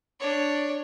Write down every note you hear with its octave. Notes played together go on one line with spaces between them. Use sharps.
D4 C#5